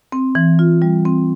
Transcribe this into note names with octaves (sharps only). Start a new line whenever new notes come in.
C4
E3
F4
G3
C4